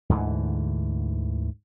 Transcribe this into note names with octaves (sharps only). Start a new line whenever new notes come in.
D2 G#2 D3 E3